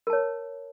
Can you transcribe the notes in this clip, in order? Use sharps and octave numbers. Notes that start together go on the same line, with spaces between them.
A#4 C#5 A5